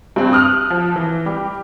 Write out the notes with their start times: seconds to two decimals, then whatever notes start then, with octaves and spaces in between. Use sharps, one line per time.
0.16 G2 C4
0.33 D#6 F6 F#6 F7
0.70 F3
0.96 E3
1.26 G3 G4